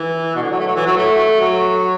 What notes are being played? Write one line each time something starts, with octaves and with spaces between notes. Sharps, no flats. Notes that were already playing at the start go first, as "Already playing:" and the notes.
Already playing: E3
B2
D3
F#3
A3
F#3
E3
F#3
A3
F#3